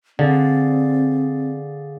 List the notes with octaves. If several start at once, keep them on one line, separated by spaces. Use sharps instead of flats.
D3 C4 G#4 D5 F5